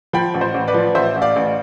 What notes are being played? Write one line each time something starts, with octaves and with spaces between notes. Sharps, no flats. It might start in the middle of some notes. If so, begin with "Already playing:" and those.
F3 G5 B5
A1
C5
A1
B4 D5
F3
A1 C5 E5
A1
D5 F5
A1